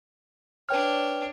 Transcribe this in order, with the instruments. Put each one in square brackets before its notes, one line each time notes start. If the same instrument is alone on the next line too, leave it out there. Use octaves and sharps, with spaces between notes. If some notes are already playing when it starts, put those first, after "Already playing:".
[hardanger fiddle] D4 C#5 [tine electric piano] B4 G5 F6